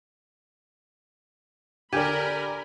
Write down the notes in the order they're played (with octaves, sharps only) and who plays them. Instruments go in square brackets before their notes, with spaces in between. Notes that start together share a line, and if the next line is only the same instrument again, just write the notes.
[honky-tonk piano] D3 D5 [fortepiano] G4 [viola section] A#4 B5 [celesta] G#5 G#6 D#7